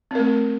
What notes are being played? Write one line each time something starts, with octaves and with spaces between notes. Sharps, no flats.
A3 C4 A#4